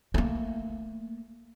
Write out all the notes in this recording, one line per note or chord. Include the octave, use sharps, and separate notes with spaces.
A3 A#3